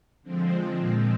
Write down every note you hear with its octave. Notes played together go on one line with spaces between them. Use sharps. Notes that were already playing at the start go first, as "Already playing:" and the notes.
D3 F3 G#3 C4
A#2 F3 G#3